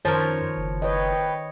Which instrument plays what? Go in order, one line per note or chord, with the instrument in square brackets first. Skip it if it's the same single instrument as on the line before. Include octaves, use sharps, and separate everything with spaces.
[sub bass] F#2 [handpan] D#3 C5 C#5 [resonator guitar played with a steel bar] F3 A#4
[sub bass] F#1
[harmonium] B4 G5 [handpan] C#5 D#5